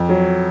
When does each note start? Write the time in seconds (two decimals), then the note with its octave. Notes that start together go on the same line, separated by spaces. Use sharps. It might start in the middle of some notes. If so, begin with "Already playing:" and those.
Already playing: F2
0.09 F#3